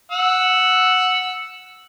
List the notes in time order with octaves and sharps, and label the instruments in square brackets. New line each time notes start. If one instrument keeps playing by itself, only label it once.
[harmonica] F#5 E6